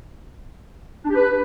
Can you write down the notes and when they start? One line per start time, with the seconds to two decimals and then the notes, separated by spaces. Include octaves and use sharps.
1.04 D4
1.09 G4
1.15 B4